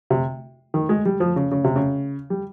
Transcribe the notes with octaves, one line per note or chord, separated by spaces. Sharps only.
C3
D#3
G#3
G3
F3
C#3
C#3
C3
C#3
G3